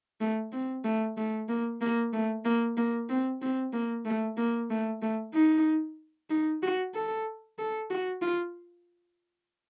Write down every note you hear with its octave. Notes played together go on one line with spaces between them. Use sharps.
A3
C4
A3
A3
A#3
A#3
A3
A#3
A#3
C4
C4
A#3
A3
A#3
A3
A3
D#4
D#4
F#4
A4
A4
F#4
F4